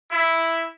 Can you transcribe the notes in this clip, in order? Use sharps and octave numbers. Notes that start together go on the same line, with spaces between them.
E4